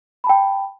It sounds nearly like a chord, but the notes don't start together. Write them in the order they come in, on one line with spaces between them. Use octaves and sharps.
B5 A5 G5